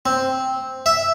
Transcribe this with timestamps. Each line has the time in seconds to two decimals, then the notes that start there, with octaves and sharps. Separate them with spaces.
0.06 C4
0.86 E5